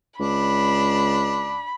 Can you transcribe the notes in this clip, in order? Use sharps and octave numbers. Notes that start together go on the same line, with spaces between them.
C#2 D4 B5